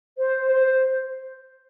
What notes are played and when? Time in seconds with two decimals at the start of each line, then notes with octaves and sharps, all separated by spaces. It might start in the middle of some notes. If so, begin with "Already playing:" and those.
0.17 C5
0.50 C5